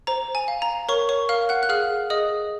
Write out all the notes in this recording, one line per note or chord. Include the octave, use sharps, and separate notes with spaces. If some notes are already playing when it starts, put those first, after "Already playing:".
C5 A#5
G#5
F5
A#5
A#4 C#5 C#6
C#5 C#6
A#4 F5 F6
F#5 F#6
F#6
G#4 F5 F6
G#4 D#5 D#6